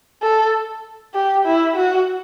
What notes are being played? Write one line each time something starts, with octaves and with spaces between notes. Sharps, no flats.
A4
G4
E4
F#4